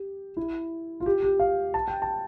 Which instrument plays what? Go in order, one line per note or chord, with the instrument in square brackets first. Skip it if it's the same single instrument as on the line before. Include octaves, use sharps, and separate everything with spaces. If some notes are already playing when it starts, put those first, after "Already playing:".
Already playing: [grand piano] G4
E4
F4
G4
G4
F5
A5
G5
A5